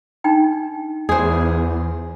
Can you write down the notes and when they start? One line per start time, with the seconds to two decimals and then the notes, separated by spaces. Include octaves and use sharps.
0.24 D4 D#4 G5
1.09 E2 G#4 C5